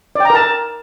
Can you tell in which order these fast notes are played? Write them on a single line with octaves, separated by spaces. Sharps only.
D5 G5 A#5 A#4 A5